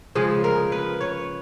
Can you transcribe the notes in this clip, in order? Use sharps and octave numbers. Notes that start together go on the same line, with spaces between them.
C#3 F3 G#3 G#4
A#4
B4
C#5